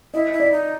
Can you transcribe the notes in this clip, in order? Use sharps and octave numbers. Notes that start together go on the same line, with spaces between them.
E4 D#5
E4
D5
D#4